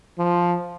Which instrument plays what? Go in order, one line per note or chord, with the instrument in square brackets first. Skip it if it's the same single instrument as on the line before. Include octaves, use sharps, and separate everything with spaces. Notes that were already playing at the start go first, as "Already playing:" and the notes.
[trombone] F3